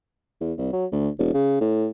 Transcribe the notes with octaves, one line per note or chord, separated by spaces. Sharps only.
E2
C2
F#3
D2
E1
C#3
A2